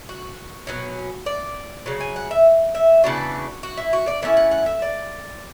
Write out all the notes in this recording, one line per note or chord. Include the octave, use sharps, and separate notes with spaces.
F#4
B2 F#3 C#4
D5
C#3 F#3
G#5
F#5
E5
E5
C#3 E3 B3 D4 F#4
F#4
E4
F#4
D5
D3 A3 C#4 E4 E5
F#5
F#5
E5
D5